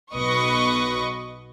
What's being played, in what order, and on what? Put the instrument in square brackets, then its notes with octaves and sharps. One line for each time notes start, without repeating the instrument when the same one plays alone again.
[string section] B1 B2 B4 D#5 C#6